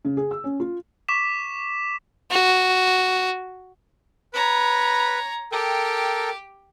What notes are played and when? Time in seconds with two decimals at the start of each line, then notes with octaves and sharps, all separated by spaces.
0.05 C#3
0.17 G#4
0.31 E6
0.44 C#4
0.60 F4
1.09 C#6 D6 B6 E7
2.31 F#4
4.34 B4 C#5 A#5 B5
5.52 G4 A4 A#4 G5